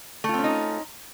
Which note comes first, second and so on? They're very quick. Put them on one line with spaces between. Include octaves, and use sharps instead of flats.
A3 F4 C4 C#4 D#4